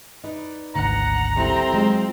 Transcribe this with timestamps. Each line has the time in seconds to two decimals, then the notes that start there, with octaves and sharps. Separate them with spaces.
0.24 D#4 B4 D5
0.75 G#1 D2 D3 F#5 A#5
1.36 G3 C4 E4 A4
1.74 F#3 G#3 F4